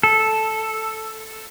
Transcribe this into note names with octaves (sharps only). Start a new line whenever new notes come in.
A4